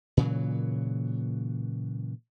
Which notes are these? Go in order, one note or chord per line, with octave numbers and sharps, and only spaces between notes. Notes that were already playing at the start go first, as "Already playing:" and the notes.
A#2 C#3 E3 F#3